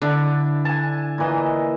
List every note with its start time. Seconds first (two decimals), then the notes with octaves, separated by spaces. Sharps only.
0.02 D3 D4 E4
0.65 G#5 A5
1.18 A#2 E3 D#5